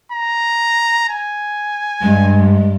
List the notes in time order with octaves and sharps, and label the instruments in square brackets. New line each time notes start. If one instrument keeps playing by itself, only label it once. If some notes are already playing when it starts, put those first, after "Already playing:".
[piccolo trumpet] A#5
G#5
[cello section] G2 [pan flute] G#3